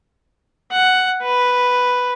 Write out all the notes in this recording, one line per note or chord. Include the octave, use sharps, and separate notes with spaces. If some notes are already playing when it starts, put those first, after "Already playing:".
F#5
B4